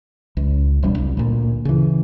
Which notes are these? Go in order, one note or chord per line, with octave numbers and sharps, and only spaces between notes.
C#2
E1 G3 D4
C2
D2 A#2
C#3 E3